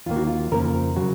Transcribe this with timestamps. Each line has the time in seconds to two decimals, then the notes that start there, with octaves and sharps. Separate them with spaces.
0.06 D#2 D#3 A#3 F4
0.16 F#4
0.27 F4
0.51 F2 C#3 F3 A#3 A#4
0.96 C#3 F#3 F#4